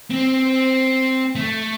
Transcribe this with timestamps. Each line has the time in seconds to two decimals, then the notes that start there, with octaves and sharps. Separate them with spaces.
0.10 C4
1.36 A3